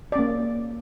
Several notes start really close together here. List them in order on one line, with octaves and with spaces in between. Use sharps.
D5 C#4 A#3